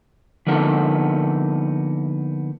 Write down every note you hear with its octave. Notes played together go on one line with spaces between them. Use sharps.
D3 F3 A#3 B3 D#4 A4